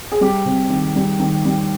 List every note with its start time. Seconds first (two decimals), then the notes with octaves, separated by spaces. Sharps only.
0.12 G#4
0.21 G3 G4
0.45 C3
0.70 D#3
0.96 G3
1.19 D#3
1.45 G3